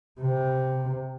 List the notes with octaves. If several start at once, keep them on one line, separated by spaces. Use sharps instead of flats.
C3